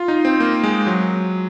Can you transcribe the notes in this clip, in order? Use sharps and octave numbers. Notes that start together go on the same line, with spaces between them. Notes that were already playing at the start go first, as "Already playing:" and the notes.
Already playing: F4
D#4
C4
A#3
G#3
F#3